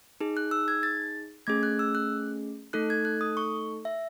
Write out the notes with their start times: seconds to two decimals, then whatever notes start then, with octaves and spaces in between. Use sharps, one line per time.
0.20 D#4 G#4
0.37 F#6
0.51 E6
0.68 G#6
0.83 A6
1.47 A3 C#4 G#4 G#6
1.63 F#6
1.79 E6
1.95 F#6
2.73 A3 D#4 A4 F#6
2.90 G#6
3.05 F#6
3.21 D#6
3.37 C#6
3.85 E5